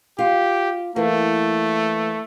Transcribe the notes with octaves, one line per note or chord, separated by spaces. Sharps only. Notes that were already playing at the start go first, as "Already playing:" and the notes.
F4 G4
E3 A3 A#3